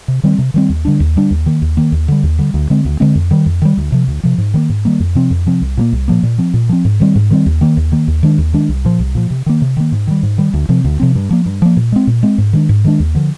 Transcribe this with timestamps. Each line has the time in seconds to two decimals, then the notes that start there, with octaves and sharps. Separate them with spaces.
0.08 C3
0.24 D#3 G3 C4
0.39 C3
0.54 D#3 G3 C4
0.70 D#2
0.85 D3 G3 D4
1.00 D#2
1.16 D3 G3 D4
1.31 D#2
1.46 D#3 A#3
1.62 D#2
1.77 D#3 A#3
1.92 D#2
2.08 D3 G3
2.23 D#2
2.39 D3 G3
2.54 D2
2.70 D3 G#3 C4
2.85 D2
3.00 D3 G#3 C4
3.15 F2
3.31 D#3 G3
3.46 F2
3.62 D#3 G3
3.77 D2
3.92 C3 F3
4.08 D2
4.23 C3 F3
4.38 G#2
4.54 D#3 G3 A#3
4.70 G#2
4.85 D#3 G3 A#3
5.00 F2
5.15 C3 F3 C4
5.31 F2
5.46 C3 F3 C4
5.61 C2
5.77 A#2 F3 A#3
5.92 C2
6.08 A#2 F3 A#3
6.23 A#2
6.38 F3 C4
6.54 A#2
6.69 F3 C4
6.85 G#2
7.00 D#3 G3 C4
7.16 G#2
7.31 D#3 G3 C4
7.46 D#2
7.61 D#3 A#3
7.77 D#2
7.92 D#3 A#3
8.08 D#2
8.23 D#3 G#3 D4
8.38 D#2
8.54 D#3 G#3 D4
8.69 C2
8.85 A#2 F3
9.00 C2
9.15 A#2 F3
9.31 C3
9.46 D#3 A#3
9.62 C3
9.77 D#3 A#3
9.92 G#2
10.07 D#3 G3
10.23 G#2
10.38 D#3 G3
10.54 D2
10.69 C3 F3 C4
10.85 D2
11.00 C3 F3 C4
11.15 G2
11.31 F3 A#3
11.46 G2
11.62 F3 A#3
11.77 A#2
11.92 G#3 C4
12.07 A#2
12.23 G#3 C4
12.38 G#2
12.53 D#3 G#3 D4
12.69 G#2
12.85 D#3 G#3 D4
13.00 D#2
13.15 D3 F3